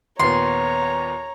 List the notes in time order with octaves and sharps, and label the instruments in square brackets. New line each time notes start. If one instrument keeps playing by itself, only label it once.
[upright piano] D#2 A#2 B3 [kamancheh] C#5 A#5 [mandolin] C6